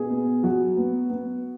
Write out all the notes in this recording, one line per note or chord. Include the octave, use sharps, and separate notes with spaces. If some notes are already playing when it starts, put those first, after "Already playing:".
Already playing: B2 G#4
B3
F#3 F#4
B3
B3